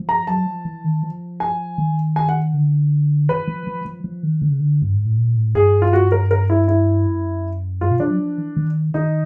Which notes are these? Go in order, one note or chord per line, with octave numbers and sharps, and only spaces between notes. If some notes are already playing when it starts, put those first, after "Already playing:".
Already playing: F3
A#5
F#3 A5
F3
E3
D#3
F3
G#5
D#3
G#5
F#5
D3
E3 B4
F3
F3
F3
F3
D#3
D3
C#3
D3
G2
G#2
A2
A#2
A2
G2 G#4
F4
F#4
A#4
A#4
E4
E4
F#2
G2 F4
B2
F3 D4
F#3
F3
E3
D#3
D#3 D#4